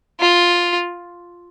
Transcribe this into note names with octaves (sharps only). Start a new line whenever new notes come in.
F4